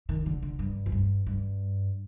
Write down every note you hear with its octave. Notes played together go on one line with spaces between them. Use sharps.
D#3
D3
D3
G2
F2
G2
G2